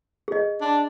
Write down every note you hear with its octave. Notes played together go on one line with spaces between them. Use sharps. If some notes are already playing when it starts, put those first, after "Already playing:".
G#4 D#5
D4